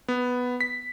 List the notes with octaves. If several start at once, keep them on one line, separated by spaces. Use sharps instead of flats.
B3
B6